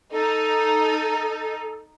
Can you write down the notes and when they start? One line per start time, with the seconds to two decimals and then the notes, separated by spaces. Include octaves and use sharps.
0.12 D#4 A4